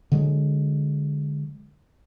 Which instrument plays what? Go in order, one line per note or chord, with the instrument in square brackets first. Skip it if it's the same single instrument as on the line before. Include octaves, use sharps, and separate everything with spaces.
[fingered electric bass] D3 F#3 G#3